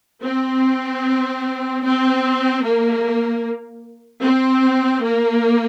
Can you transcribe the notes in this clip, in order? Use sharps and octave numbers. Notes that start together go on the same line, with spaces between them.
C4
C4
A#3
C4
A#3